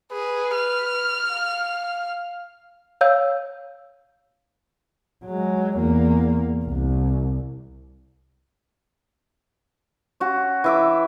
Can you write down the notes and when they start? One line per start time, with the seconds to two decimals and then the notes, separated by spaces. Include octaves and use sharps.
0.12 G#4 B4
0.55 F6
1.30 F5
3.01 C#5 F5 E6 G6
5.25 F#3 G#3
5.77 E2 A#3
6.65 C2
10.20 C#4 F#4
10.64 E3 E5 D6